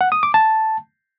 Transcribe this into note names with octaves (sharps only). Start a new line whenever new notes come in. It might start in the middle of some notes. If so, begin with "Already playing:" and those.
F#5
D#6
D6
A5